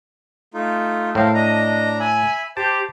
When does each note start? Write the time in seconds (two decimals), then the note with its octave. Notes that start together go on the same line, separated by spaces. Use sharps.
0.54 A3 D#4 F4
1.15 A2 A4 A#4 C5 F5
1.34 D4 D#5 A#5
2.00 E5 G#5 B5
2.57 G4 C5 A5 D6